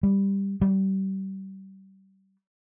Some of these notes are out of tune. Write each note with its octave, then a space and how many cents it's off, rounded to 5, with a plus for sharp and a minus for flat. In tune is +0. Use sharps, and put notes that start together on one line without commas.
G3 +10
G3 -30